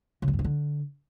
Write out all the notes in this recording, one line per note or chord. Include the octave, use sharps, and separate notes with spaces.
C#3
G3
G2
C3
D3